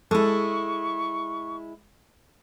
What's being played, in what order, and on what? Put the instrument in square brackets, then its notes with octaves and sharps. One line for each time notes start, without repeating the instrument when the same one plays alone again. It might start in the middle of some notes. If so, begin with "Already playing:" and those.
[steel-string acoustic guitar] G#3 E4 [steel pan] A4 [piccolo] C#6